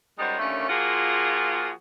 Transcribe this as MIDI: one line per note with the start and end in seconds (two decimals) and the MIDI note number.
0.19 0.36 42
0.19 0.36 55
0.19 0.36 56
0.19 0.36 63
0.19 0.36 66
0.19 0.36 72
0.39 0.67 39
0.39 0.67 50
0.39 0.67 57
0.39 0.67 58
0.39 0.67 61
0.69 1.71 53
0.69 1.71 58
0.69 1.71 65
0.69 1.71 66
0.69 1.71 68